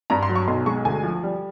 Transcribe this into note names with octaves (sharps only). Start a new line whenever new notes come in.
G2 A#5
C6
F#3
C#6
B1 C6
G#3 C#6
D2 G#5
F3
G3